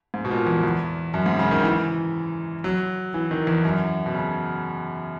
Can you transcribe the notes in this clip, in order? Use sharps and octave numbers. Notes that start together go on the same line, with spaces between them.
G#2
B2
A#2
E2
E2
F#2
G#2
C#3
D#3
E3
F#3
E3
D#3
E2
F#2
B2
C#3